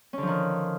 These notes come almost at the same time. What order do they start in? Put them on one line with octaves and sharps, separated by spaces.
C#4 D3 F3 D#3